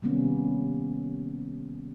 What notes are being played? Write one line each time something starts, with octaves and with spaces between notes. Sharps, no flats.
C3 D#3 G3 A#3 B3 C#4